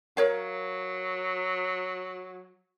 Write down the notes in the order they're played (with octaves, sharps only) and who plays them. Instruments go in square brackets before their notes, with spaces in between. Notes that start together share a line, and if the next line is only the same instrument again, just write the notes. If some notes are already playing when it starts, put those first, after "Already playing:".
[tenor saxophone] F#3 [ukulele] A#4 C#5 F5